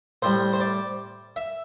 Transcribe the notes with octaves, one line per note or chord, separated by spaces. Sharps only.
A2 G3 C5
C5
D5
E5